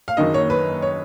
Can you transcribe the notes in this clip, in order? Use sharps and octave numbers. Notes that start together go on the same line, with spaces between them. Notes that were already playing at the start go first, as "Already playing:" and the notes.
F5
F#1 F#2 D#3 A#3 D#4 D#5
C#5
B4
C#5